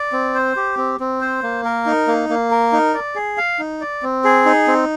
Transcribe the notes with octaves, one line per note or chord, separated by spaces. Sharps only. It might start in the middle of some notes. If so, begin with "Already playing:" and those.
Already playing: D5
C4
C5
G4
C4
C4
C5
A#3
A#4
D#4
A#3
A#3
A#4
D#4
D5
G#4
F5
D#4
D5
C4
G#4
D#4
C4